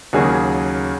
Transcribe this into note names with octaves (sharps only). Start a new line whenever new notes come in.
D#2 C#3 F#3 A#3 G#4